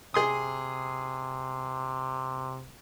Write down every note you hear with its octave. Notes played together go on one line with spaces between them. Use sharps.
C3 G#4 C6 D#6